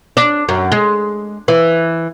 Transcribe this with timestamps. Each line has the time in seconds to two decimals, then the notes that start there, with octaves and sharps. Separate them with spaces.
0.17 D4
0.49 F#2
0.72 G#3
1.48 E3